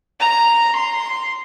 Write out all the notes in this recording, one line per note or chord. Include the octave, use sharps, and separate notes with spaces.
A#5
C6